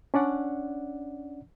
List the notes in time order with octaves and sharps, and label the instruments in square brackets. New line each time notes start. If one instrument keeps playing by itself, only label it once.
[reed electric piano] C#4 D4 D5 F#5